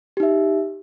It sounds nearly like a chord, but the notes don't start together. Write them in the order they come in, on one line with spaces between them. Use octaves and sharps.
G4 D#4 E5